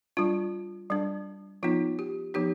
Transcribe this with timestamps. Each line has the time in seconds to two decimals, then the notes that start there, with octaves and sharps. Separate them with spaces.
0.17 G3 D4 F4
0.90 G3 D4
1.63 F3 B3 D#4 F4
1.99 G4
2.34 F3 B3 D#4 G4